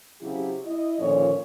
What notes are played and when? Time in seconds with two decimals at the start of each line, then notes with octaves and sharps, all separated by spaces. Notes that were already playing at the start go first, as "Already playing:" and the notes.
0.21 C#3 F#3 C4 E4 G4
0.64 E4 D#5
0.99 A#2 D3 D#3 F3 C#4 C#5